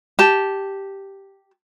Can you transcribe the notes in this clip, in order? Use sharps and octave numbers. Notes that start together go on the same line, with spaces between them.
G4 A5